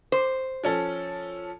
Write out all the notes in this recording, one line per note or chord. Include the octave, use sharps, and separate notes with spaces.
C5
F3 C#4 A4